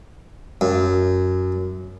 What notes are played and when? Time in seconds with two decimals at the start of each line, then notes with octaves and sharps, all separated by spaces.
0.61 F#2